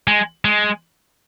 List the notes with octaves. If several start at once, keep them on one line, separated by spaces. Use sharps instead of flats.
G#3
G#3